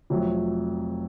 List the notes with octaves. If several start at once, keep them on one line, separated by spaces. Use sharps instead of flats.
F1 F2 C3 F#3